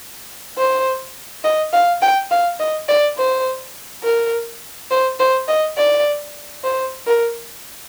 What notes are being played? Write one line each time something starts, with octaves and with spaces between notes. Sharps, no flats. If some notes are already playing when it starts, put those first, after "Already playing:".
C5
D#5
F5
G5
F5
D#5
D5
C5
A#4
C5
C5
D#5
D5
C5
A#4